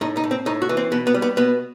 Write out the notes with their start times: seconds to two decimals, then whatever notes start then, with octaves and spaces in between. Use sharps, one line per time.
0.01 A2 D#4
0.17 D#4
0.24 A2
0.31 C4
0.46 A2 D#4
0.62 F#4
0.69 E3
0.77 C4
0.92 B2 B3
1.07 B3
1.14 G3
1.22 B3
1.37 B2 B3